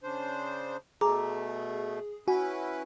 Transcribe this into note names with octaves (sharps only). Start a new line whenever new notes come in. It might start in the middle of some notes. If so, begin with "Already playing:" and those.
C#3 D4 C5
B2 A3 G#4 A#5 D6
C#4 E4 F#4 B4 G#5